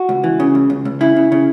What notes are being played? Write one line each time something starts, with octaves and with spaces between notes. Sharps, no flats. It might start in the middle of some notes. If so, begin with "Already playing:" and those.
Already playing: F#4
C#2
E3
C#3
C#2
C#2
C#2
C#3 E4
C#3
C#3